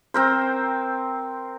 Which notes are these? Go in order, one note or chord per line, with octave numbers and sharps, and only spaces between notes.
C4 A#4 C5